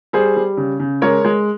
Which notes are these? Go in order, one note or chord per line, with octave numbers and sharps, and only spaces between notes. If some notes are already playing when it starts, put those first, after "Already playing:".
G3 G#4 C5
G3
C#3
C#3
G#3 A#4 C#5
G#3